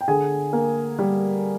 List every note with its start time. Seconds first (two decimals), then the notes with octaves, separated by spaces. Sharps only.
0.01 G5
0.08 D3 G#4 G#5
0.53 A#3
0.99 G3